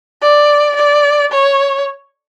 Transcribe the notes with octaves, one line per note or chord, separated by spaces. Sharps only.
D5
D5
C#5